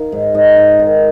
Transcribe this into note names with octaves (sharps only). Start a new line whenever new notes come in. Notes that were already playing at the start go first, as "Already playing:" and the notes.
Already playing: D#3 F5
G#2
G#2 D#5
G#2
D#3